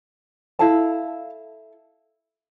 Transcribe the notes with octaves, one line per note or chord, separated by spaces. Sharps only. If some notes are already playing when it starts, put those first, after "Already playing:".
E4 A4 F5 A5